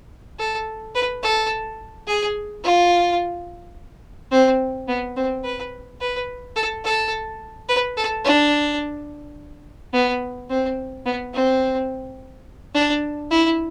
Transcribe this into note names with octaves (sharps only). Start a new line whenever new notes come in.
A4
B4
A4
G#4
F4
C4
B3
C4
B4
B4
A4
A4
B4
A4
D4
B3
C4
B3
C4
D4
E4